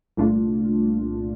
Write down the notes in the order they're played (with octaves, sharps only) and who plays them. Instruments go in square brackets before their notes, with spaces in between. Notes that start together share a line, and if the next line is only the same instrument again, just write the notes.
[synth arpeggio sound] C2 A#2 A3 D4 F4